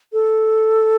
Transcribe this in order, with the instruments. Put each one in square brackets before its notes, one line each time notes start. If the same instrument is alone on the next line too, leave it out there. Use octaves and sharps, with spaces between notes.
[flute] A4